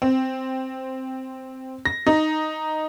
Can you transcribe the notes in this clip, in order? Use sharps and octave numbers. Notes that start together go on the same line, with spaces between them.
C4
A#6
D#4